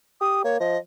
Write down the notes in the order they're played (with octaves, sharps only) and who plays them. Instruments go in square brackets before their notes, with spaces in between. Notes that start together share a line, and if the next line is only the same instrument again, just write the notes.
[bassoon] G4 [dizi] D#6
[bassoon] A#3 [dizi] C#5
[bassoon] F3 [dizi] D#5